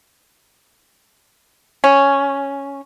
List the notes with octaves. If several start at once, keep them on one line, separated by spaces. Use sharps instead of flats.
C#4